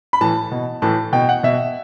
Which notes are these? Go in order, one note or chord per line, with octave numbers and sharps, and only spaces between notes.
B5
A2 E3 A5
B2
A2 E3 A5
B2 G5
F#5
B2 E5